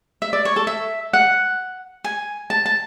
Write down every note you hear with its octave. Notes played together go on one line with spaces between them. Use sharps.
E5
D5
C#5
A4
E5
F#5
G#5
A5
A5